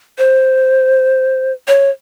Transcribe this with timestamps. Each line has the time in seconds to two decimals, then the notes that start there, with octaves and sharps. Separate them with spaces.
0.18 C5
1.68 C#5